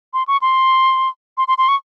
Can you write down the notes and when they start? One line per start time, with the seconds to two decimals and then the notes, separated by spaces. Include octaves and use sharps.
0.14 C6
0.28 C#6
0.42 C6
1.38 C6
1.48 C6
1.58 C6
1.68 C#6